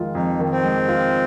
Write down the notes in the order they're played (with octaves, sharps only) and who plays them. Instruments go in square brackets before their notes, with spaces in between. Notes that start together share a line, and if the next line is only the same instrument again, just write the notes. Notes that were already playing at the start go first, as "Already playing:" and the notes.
Already playing: [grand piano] F2 D#3 G#3 F4
[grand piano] F2 [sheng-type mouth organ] D#4
[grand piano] D#3
[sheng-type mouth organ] C4
[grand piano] G#3
F4